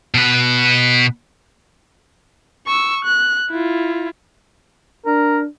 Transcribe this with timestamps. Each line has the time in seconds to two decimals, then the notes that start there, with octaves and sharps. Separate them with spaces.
0.14 B2 B4
2.67 C#6 E6
3.05 F#6
3.51 E4 F4
5.05 D4 A#4